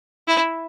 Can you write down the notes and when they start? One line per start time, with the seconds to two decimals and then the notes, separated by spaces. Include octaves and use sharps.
0.28 E4